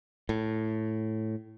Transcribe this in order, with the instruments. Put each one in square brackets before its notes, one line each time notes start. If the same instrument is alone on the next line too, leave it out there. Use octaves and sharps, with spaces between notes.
[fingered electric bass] A2